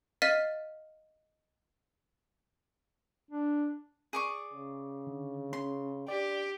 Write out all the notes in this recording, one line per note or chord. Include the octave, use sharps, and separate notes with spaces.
D#5 F5 F6 A6 B6 D#7
D4
G#4 D5 C#6
C#3
D3
C#4 C6
D4 G4 D5